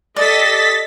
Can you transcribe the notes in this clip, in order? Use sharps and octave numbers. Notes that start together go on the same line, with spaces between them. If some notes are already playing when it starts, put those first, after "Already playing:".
G4 A4 D5 D#5 A6 B6